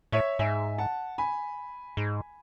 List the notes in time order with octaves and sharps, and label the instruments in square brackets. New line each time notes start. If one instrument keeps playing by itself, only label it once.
[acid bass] A2 [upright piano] C#5 E5
[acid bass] G#2 [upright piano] E5 G#5
[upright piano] F#5 A5
G#5 B5
[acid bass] G#2